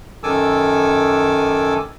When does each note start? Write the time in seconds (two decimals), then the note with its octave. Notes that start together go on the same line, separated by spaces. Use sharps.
0.23 F#2 D#3 A4 G#5 D6 E6